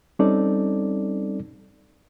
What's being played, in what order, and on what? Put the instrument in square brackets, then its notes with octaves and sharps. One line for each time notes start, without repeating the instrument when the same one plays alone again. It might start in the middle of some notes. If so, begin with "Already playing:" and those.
[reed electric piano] G3 C4 C#4 D#4 A4 D5